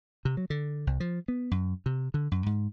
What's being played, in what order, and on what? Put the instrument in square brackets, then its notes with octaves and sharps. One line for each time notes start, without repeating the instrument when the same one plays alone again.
[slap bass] C3
F#3
D3
C2
F3
B3
F#2
C3
D3
F#2
G#2